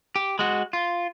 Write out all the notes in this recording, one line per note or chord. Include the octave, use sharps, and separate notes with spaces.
G4
G#3 F#4
F4